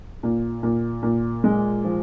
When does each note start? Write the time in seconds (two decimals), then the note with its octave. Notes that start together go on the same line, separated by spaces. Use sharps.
0.23 A#2
0.63 A#2
1.03 A#2
1.44 G#3
1.84 F3